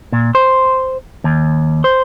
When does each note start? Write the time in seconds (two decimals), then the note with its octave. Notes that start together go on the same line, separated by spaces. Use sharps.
0.12 A#2
0.35 C5
1.24 D#2
1.84 C5